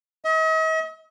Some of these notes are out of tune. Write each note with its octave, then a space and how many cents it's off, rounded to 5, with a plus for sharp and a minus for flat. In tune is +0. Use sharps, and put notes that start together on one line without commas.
D#5 +45